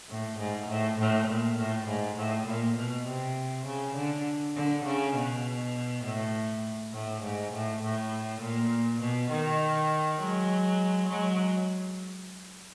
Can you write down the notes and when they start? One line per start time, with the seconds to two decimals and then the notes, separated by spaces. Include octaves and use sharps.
0.09 A2
0.39 G#2
0.69 A2
0.99 A2
1.28 A#2
1.58 A2
1.88 G#2
2.17 A2
2.47 A#2
2.77 B2
3.07 C3
3.66 C#3
3.96 D3
4.55 D3
4.85 C#3
5.15 B2
6.04 A2
6.93 A2
7.22 G#2
7.53 A2
7.82 A2
8.41 A#2
9.01 B2
9.31 D#3
10.20 F#3 G#3
11.09 F#3 G#3